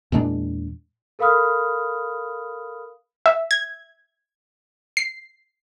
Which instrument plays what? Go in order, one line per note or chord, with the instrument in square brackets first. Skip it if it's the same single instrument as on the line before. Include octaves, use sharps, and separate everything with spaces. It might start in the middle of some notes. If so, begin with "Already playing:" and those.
[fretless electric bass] E2 A#2 G#3 D4
[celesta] A4 A#4 F5 B5 D#6 F6
[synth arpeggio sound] E5
G#6
C7